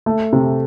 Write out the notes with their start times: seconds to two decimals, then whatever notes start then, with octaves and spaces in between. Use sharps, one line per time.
0.06 A3
0.33 C3